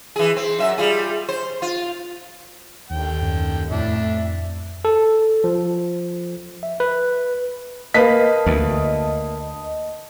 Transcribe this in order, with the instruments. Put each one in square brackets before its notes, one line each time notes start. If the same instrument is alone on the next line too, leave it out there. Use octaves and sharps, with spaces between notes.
[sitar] E3 G#4
C4
F#2 E5
G3 F4 G#4
C5
F4
[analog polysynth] D#2 [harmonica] D3 G5
[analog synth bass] F#2
[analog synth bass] F2 [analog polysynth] A2 [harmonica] D4 E5
[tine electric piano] A4
F3
E5
B4
[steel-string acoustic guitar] A#3 [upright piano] B4 F5 B6 [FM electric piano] D#5 A5 D#6
[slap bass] D2